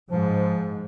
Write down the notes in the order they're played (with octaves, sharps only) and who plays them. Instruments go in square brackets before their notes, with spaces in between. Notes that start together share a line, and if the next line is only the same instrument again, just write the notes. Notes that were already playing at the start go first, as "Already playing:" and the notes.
[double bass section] G#2 [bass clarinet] F3